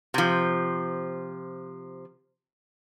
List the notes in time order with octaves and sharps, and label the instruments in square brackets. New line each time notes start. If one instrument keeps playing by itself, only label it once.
[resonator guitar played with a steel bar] C3 F3